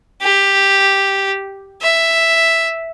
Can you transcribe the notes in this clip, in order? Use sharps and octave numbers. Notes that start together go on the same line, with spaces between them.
G4
E5